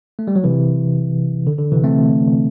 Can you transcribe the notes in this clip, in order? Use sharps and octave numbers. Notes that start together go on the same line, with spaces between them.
A3
G3
F#3
C3 E3
D3
D3
C3 E3
A3 C4